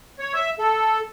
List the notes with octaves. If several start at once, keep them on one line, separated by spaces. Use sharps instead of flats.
C#5
E5
A4